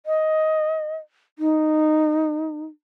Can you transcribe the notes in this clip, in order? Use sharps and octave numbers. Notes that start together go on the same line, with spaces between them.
D#5
D#4